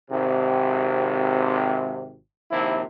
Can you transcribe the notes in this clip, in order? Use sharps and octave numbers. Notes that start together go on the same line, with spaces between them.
G#1 C3
A#1 D#2 C3 F3 E4